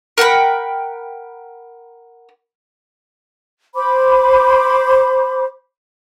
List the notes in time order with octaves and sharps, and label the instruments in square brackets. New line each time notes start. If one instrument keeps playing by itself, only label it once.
[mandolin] A#4 F#5 G5 B5
[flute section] C5 B5 D6